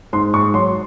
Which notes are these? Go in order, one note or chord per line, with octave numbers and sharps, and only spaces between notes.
G#2 C6
G#2 C#6
F#3 C6